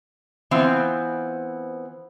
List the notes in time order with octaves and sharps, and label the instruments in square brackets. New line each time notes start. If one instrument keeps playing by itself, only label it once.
[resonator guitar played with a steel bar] E3 B3 C4 F4